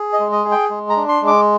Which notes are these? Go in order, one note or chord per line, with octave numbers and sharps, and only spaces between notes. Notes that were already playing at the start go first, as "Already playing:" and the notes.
Already playing: G#4
D#5
G#3
D#5
G#4
G5
G#3
A#5
D4
C6
G#3
D6